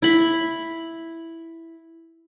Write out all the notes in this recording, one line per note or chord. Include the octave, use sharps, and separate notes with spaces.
E4 B5